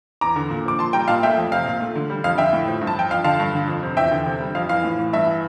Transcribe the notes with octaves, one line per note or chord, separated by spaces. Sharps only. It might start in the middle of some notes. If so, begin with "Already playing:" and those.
E2 A#5 D6
D3
A#2
F3 D6
A#2 A5 C6
G3 G5 A#5
A#2 F5 A5
A3 E5 G5
F2
C3 F5
A#2
A3
D3
G3
F2 F5
D3 E5 G5
A2
F3
G2
A5
F3 G5
F2 F5
D3 F5 A5
G2
D3
F2
C3
E2 E5 G5
D3
C3
G3
F2 F5
E3 F5
A2
E3
G2 E5
E3